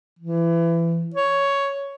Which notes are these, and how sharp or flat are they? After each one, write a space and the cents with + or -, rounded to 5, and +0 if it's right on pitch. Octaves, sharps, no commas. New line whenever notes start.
E3 +25
C#5 +5